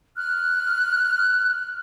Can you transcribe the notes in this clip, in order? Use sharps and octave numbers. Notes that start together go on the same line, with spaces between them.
F6 F#6